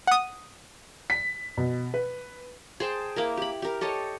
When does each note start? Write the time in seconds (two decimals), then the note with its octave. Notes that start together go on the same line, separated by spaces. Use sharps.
0.07 F#5 D#6
1.10 B6
1.57 B2
1.94 B4
2.80 G#4 C5 G5 A5
3.16 A#3 E4 A#4
3.37 G4 B5
3.62 G4 A#4
3.81 G4 A4 C#5 D#5